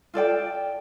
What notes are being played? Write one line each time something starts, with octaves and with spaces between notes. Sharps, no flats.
F4 A4 D5 G5